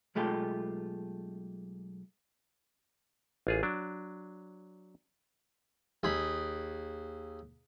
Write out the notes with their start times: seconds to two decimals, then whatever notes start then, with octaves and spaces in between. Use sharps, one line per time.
0.15 B1 G#3 A3 F4 G4
3.47 A1 F4 G#4
3.63 F#3 D4
6.03 D#2 G#4 B5